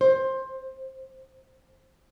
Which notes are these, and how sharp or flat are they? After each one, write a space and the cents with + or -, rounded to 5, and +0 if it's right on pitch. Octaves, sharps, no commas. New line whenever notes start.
C5 +15